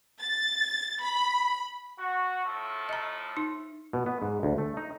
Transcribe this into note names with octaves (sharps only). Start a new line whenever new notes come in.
A6
B5
F#4
A2 F3 A3
D#5 A#5
D#4
B2
B3
G#2
D2
A3
D#4